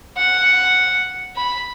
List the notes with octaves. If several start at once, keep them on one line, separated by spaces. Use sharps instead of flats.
F#5
B5